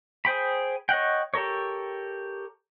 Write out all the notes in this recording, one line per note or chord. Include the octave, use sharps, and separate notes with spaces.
G#4 C5 G5 B5
C#5 D#5 F#5 G5
G4 A4 A#4 C#5